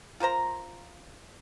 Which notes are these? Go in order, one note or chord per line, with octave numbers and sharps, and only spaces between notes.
F4 A#4 C5 A#5